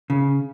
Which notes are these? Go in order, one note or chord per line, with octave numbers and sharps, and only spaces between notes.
C#3